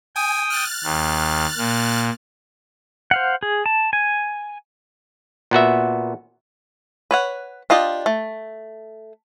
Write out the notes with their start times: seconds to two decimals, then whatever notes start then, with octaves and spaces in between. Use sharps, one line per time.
0.16 G5 G#5 D#6
0.50 F6 F#6 A6
0.84 D#2
1.58 A#2
3.11 C5 F5 F#5
3.43 G#4
3.66 A5
3.93 G#5
5.51 A#2 B3 F#4 E5
7.11 B4 C#5 F#5
7.70 D4 F4 G4 D#5
8.06 A3